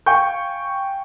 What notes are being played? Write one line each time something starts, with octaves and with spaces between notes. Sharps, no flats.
F5 G5 G#5 C#6 G6